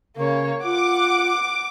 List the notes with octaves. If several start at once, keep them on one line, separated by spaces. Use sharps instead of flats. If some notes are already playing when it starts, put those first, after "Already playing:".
C#3 A#3 C#5
F4 F#5 D6